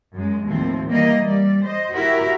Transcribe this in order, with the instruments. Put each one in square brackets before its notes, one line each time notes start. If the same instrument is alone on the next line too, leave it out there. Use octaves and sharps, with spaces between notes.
[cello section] F#2 G#3
D#2 A2 F3 C4
E3 G3 A#3 D#5
G3 D5
C5 D#5
E4 F#4 G4 A#4 E5